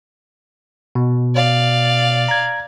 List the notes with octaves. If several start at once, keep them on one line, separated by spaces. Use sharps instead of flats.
B2
D5 F5
A#5 G#6